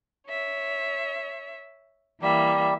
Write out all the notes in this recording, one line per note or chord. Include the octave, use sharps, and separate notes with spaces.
C#5 E5
E3 G3 A#3 E5